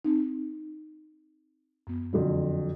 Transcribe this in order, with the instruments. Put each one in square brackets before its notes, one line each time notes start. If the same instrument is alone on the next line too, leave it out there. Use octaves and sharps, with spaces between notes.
[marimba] C4 D#4
F#2 B3
[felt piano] F2 D3 F#3